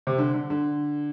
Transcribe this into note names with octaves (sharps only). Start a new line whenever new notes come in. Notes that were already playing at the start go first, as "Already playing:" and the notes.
C3
D3
D3
D3